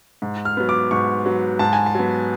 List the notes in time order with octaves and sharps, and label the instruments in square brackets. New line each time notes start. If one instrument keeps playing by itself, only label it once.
[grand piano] G#2
F6
F#3 B3
D6
G#2 C#6
F#3 B3
G#2 A5
G#5
A5
F#3 B3